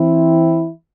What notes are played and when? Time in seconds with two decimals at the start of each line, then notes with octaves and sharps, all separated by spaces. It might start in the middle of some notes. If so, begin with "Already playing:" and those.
Already playing: E3 C4 E4